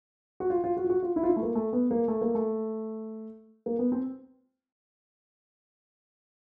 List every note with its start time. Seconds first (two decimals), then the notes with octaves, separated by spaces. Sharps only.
0.40 F#4
0.50 F4
0.64 F4
0.77 F#4
0.84 F4
0.90 F#4
1.03 F4
1.16 E4
1.23 F4
1.29 E4
1.36 A3
1.43 A#3
1.55 A3
1.73 B3
1.91 A#3
2.08 A3
2.21 A#3
2.35 A3
3.66 A#3
3.79 B3
3.92 C4